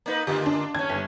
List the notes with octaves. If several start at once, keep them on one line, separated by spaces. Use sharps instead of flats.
A#3 D#4 B4
D3 A#3 F4 G4
D4
D#2 C#4 G#6
G1